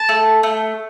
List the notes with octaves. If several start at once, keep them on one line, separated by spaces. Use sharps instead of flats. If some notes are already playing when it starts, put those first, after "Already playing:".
Already playing: A5
A3
A3